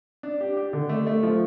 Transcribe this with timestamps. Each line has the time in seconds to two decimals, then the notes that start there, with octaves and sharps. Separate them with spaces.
0.23 D4
0.41 G4
0.57 G4
0.73 D3
0.89 A3
1.07 A3
1.23 F3